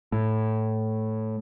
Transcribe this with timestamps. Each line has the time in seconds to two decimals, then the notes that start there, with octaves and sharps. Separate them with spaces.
0.12 A2